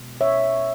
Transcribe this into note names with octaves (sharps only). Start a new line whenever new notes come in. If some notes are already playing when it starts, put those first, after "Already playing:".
Already playing: B2 G#3
C#5 E5